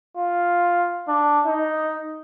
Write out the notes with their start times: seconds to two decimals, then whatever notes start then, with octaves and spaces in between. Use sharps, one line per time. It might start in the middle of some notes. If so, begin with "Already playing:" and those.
0.17 F4
1.08 D4
1.46 D#4